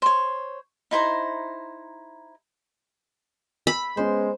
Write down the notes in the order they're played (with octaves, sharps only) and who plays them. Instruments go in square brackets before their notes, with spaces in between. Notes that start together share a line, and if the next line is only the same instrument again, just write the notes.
[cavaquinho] C5 C#5
D#4 E4 C5 A#5
[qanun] B5 [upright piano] E6
[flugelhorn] G#3 [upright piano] B3 C#4 [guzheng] C5